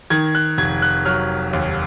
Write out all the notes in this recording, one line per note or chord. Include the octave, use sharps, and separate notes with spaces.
D#3 G#6
F#6
F1 G#6
F#6
F#3 F6
D#2